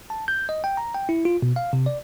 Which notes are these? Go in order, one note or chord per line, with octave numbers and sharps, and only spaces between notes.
A5
G6
D#5
G5
A#5
G5
E4
F4
B2
F5
C3
D5